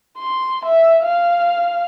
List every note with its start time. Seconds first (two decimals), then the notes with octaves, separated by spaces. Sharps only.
0.18 C6
0.65 E5
1.03 F5